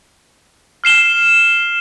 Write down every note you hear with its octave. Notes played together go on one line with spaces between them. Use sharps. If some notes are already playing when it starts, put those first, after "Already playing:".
F6 C7 E7 G7